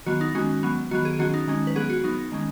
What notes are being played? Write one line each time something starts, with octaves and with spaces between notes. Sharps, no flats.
D#3 F#3 B3 F#4
D#4
D#3 G#3 C#4 F#4
F#3 B3
D#3 F#3 B3 F#4
G#4
D#3 F#3 C#4 F#4
D#4
D#3 G#3 C#4
B4
F#3 B3 G#4
F#4
F#3 B3 D#4
D#3 G#3 C#4